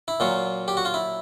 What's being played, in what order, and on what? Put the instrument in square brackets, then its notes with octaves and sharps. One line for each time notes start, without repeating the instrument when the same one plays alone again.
[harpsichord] E4
A#2 F#3 F4
G4
F#4
F4
E4